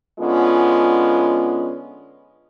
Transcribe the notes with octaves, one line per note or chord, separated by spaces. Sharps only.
D3 G#3 B3 C#4 F4